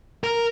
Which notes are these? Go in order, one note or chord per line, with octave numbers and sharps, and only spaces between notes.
A#4